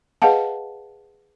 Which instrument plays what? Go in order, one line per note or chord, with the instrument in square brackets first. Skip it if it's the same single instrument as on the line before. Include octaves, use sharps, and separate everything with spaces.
[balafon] G#4 B4 D#5 F5 F#5 A5